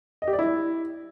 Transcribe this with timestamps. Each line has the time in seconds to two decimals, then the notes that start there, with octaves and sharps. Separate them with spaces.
0.22 D#5
0.28 G4
0.33 D5
0.39 E4